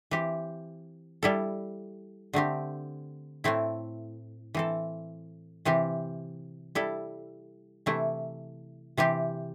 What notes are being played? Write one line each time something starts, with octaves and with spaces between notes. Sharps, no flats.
E3 C4 G4
G3 E4 A4
D3 A3 C4 G4
A2 A3 C4 E4
E3 C4 A4
C3 E3 C4 G4
G3 E4 A4
C3 E3 A3 E4
C3 E3 C4 G4